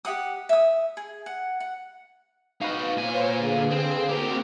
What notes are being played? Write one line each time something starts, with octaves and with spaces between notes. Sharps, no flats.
G4 F5 F#5 D#6
E5 D#6
G#4
F#5
F#5
D#4 F#4 B4 F5
A#2 C5 C#5 G#5
D3 G#4
C4
A#3 C4 F#4 G4 A#4